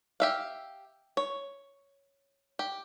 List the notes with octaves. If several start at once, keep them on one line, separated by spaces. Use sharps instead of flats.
G4 E5 F5
C#5
G4